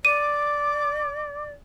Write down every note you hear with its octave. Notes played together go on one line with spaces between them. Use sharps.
D5 D6 D#7